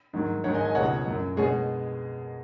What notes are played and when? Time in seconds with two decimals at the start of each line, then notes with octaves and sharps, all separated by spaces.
0.13 G#2 D#3 F#3
0.44 G#2 D#3 F#3 C#5 F#5
0.54 D#5 G#5
0.64 D#5 G#5
0.75 C#2 B2 G#3 C#5 F#5
1.07 F#2 F#3
1.37 B2 G#3 G#4 C#5